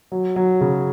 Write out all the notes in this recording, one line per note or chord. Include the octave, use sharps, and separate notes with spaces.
F#3
F#3
C#3